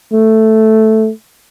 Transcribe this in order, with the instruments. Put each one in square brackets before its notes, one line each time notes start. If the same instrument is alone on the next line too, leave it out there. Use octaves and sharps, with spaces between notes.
[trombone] A3